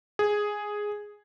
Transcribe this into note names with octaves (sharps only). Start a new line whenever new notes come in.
G#4